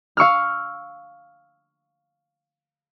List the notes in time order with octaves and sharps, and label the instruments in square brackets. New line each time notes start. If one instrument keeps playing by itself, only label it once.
[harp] F5 C#6 E6 F6